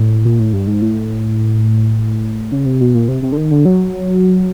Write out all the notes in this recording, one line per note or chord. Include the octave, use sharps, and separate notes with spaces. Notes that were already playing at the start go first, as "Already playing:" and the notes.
Already playing: A2
A#2
A2
G2
G#2
A2
C#3
C3
B2
A#2
C3
C3
D3
D#3
D3
F#3